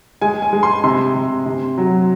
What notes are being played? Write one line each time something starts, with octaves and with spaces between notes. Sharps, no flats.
G#3 G#5
G#5
G#3
C6
C3 C6
C3
C3
F#3